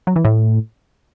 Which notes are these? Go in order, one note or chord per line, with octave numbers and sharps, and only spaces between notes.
F#3
E3
A2